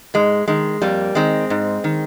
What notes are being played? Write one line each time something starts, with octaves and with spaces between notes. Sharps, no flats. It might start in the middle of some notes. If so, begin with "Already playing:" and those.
G#2 G#3
D#3 G#3
F2 G3 A#3
D#3 G#3 C4
G#2
D#3